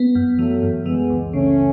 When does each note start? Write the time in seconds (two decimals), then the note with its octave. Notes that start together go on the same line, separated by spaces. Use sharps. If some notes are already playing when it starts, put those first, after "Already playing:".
Already playing: B3
0.15 F#2
0.38 E3 F#3 A3
0.63 F#2
0.86 E3 G#3 B3
1.10 C#2
1.33 C#3 A3 C#4